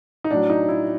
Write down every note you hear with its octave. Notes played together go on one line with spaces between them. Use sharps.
D#4
A2 F#3 D4
D#4
E4